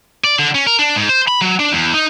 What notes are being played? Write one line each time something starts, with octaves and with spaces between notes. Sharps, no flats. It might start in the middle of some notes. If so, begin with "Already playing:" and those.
D5
D3
C#4
A#4
D4
G#2
C5
B5
F#3
D4
E2
D#4